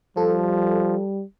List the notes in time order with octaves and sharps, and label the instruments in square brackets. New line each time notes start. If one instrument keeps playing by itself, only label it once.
[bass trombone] F3 [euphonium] G3 [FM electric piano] A4